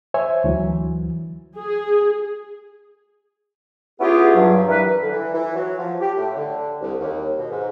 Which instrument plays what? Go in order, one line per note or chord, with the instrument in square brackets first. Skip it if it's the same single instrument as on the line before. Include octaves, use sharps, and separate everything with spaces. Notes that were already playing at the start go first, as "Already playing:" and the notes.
[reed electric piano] C5 C#5 E5 G#5
D2 E3 F#3
[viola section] G#4
[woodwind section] B3 C#4 E4 F4 G4 G#4
G2 F#3
E3 G3 A#4 B4
D3
E3
E3
F#3
F3
G4
A2
D3
C2
D#2
B2
G#2